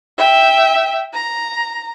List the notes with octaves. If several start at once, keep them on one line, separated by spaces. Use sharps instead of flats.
E5 G5
A#5